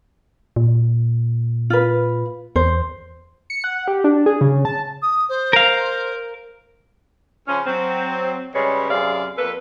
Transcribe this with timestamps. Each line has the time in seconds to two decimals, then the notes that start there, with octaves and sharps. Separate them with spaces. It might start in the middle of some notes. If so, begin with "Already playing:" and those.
0.56 A#2
1.70 F4 B4
2.56 E2 C5
3.50 C#7
3.64 F#5
3.88 G4
4.04 D4
4.26 G#4
4.41 C#3
4.65 A5
5.02 D#6
5.29 C5
5.53 A#4 F5
7.48 C#3 F3 C#4
7.66 F#3 C4
8.55 C#3 G3 G#3 B4 C#5
8.90 F#2 C3 G#4 D5 F5
9.38 F2 A#3 A4 B4